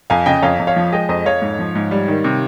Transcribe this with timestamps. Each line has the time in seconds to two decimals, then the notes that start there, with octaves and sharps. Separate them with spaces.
0.10 F2 F5 G#5
0.26 C#3 D#5 G5
0.42 F2 C#5 F5
0.59 F2
0.67 C#5 F5
0.76 F3
0.92 G#3 D#5 G5
1.09 F2 C5 D#5
1.26 F2 C#5 F5
1.42 G#2
1.59 F3
1.75 G#2
1.91 G3
2.08 D#3
2.24 C3